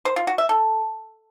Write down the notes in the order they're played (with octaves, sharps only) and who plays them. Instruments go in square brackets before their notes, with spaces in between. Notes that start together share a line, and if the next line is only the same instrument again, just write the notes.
[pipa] C5
F4
F#4
E5
A4